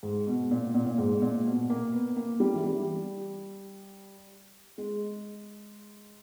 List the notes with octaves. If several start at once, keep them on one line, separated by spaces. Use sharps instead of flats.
G#2
B2
A#2
A#2
A#2
G#2
A#2
B2
A#3
B3
A#3
G3
E3
G3
G#3